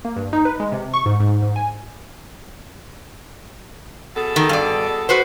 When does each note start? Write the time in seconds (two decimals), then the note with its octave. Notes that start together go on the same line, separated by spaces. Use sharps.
0.05 A#3
0.16 G2
0.33 D#4
0.45 B4
0.60 G#3
0.72 C3
0.94 C#6
1.06 G#2
1.20 G#2
1.42 G#2
1.56 G#5
4.17 B2 G#4 A4
4.36 D#3
4.49 G2 D5
5.09 F#4 B4 C5